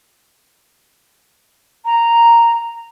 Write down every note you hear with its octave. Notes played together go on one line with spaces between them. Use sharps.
A#5